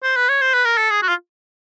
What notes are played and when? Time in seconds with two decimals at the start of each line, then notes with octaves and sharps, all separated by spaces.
0.03 C5
0.16 B4
0.29 C#5
0.41 C5
0.54 B4
0.65 A#4
0.78 A4
0.91 G#4
1.02 F#4
1.09 F4